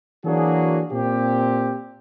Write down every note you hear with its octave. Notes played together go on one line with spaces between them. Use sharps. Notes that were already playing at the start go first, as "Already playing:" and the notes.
E3 F#3 A#3 D4 F#4 G#4
A#2 C4 G4